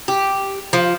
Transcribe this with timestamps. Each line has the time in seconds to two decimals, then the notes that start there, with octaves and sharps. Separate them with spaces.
0.08 G4
0.73 F3